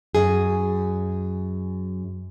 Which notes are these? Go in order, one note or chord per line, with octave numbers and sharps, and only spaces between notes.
F#2 G#4